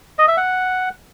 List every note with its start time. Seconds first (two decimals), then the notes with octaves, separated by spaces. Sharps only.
0.19 D#5
0.28 E5
0.37 F#5